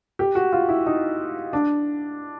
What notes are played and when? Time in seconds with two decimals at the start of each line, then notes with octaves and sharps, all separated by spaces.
0.19 G4
0.35 F#4
0.53 F4
0.69 E4
0.86 D#4
1.53 D4